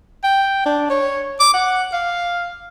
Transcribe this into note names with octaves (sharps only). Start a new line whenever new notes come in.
G5
D4
C#5
D6
F#5
F5